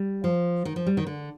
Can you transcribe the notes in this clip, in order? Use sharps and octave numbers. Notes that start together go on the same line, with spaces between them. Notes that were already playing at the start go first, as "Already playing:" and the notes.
Already playing: G3
F3
D#3
F3
G3
D#3
D3